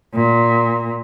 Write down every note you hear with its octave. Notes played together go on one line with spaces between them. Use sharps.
A#2